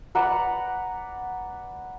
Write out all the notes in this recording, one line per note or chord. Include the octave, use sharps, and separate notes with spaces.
B4 D5 F#5 A#5